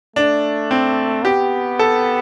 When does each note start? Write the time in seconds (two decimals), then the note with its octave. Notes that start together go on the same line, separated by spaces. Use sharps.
0.16 A3 D4
0.71 C4
1.25 B3 G4
1.79 A4